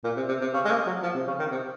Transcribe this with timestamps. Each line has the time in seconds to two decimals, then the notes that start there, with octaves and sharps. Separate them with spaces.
0.04 A#2
0.16 C3
0.28 C3
0.41 C3
0.54 C#3
0.65 G#3
0.70 A#3
0.87 F#3
1.03 F3
1.15 C3
1.27 C#3
1.39 D#3
1.52 C3